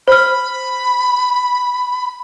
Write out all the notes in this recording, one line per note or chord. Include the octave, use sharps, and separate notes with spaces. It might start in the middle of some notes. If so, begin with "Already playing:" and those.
C5 B5 F6